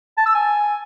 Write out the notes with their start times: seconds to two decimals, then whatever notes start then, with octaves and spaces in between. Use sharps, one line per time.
0.18 A5
0.26 E6
0.35 G#5